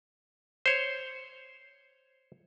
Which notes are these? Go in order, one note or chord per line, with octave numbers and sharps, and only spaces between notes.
C5 C#5